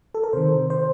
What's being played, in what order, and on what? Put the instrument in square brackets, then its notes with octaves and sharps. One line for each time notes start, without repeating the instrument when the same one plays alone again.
[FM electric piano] A4
A#4
C3 D#3 C5
C5